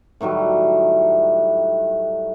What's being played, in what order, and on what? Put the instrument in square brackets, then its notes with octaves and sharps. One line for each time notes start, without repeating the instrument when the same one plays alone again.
[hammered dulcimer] A2 D#3 F#3 G3